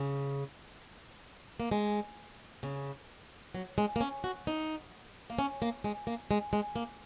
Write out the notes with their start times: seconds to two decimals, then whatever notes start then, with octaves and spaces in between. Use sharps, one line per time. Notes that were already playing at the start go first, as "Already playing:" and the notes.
Already playing: C#3
1.60 A#3
1.72 G#3
2.63 C#3
3.55 F#3
3.78 G#3
3.96 A#3
4.01 C#4
4.24 F#4
4.47 D#4
5.30 A#3
5.39 C#4
5.62 A#3
5.84 G#3
6.07 A#3
6.31 G#3
6.53 G#3
6.76 A#3